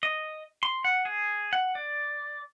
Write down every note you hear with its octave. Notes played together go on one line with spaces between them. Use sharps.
D#5
C6
F#5
G#4
F#5
D5